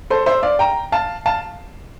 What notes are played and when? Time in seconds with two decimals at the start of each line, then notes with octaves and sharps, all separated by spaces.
0.10 A4 C5
0.26 C5 E5
0.43 D5 F5
0.59 G5 A#5
0.92 F5 A5
1.26 F5 A5